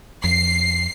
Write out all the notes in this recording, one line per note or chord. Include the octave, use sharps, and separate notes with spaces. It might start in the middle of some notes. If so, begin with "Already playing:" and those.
F2 C7